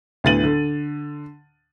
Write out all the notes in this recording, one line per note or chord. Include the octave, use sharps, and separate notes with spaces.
D2 A2 B3 A6 D#7 F#7
D3